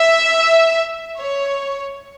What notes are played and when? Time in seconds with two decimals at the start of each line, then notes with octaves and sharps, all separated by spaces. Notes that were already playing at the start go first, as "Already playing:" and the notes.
Already playing: E5
1.20 C#5